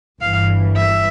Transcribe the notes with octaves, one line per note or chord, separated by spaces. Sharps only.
G1 G2 E3 F5
E5